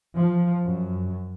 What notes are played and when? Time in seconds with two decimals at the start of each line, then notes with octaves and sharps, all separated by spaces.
0.17 F3
0.66 F#2